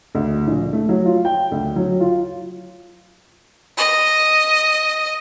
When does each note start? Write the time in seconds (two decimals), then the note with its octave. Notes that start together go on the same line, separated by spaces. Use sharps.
0.15 D2
0.47 A#1
0.73 A3
0.89 F#3
1.05 F4
1.25 G5
1.52 D2
1.76 F#3
2.00 F4
3.76 D#5